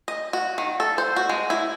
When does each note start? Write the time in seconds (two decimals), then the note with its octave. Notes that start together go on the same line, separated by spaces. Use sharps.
0.08 D#5
0.33 F#4
0.58 D#3
0.80 A4
0.98 C5
1.16 F#4
1.29 G#3
1.50 E4